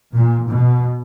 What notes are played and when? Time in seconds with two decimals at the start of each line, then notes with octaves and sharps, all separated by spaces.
0.14 A#2
0.49 B2